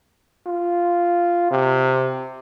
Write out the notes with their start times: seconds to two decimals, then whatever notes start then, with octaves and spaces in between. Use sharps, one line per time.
0.47 F4
1.51 C3